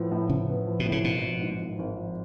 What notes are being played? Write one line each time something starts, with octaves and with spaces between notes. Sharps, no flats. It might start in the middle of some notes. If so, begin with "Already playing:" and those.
Already playing: A2 F3 B3
A2
A2 C#3
B3
F3
B2
A2
C#3
G#1 B2
F3
G#2
G#1
G#1
F3